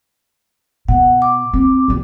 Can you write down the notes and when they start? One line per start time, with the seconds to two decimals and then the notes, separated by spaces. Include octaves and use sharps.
0.88 B2 F#5
1.22 D6
1.54 C4
1.88 C2 G2